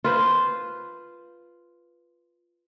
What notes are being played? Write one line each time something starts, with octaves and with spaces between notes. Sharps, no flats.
F4 B4 C5